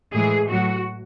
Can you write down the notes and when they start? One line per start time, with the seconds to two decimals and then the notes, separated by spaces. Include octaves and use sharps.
0.13 A2 E3 G#3 G#4
0.49 A2 F#3 F#4